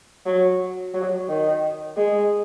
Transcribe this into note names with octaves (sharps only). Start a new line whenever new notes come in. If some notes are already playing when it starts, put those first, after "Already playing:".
F#3
F#3
D#3
G#3